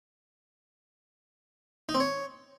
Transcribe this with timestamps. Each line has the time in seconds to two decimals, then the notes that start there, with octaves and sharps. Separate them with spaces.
1.89 D#4
1.95 C4
2.00 C#5